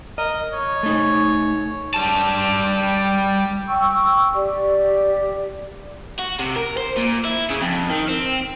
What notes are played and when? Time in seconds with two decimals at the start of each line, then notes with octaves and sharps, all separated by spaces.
0.18 A#4 D#5
0.53 C#5
0.83 A3 D#4
1.94 G3 A5
3.68 G5 C#6 E6
4.35 G4 D5
6.19 F#4
6.40 C3
6.56 A#4
6.77 C5
6.97 A#2
7.25 E4
7.50 C#3
7.61 F2
7.90 D#3
8.09 C4